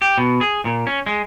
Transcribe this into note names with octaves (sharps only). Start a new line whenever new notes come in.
G4
B2
G#4
A#2
C#4
G#3